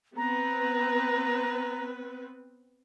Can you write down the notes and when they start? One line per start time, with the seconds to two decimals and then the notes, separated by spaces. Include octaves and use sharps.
0.17 B3 C4 B4 A#5